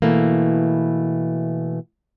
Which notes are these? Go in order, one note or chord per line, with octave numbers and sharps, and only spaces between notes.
B2 E3 A3 A#3